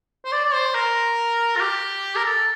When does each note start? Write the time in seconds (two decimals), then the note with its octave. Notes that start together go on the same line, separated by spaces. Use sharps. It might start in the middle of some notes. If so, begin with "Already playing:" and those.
0.25 C5
0.32 D5
0.44 D5
0.53 C5
0.75 A#4
1.56 F4
1.60 G4
2.16 A#4
2.25 A4